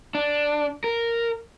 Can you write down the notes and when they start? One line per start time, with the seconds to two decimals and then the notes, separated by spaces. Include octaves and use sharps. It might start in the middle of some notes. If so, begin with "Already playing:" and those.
0.15 D4
0.84 A#4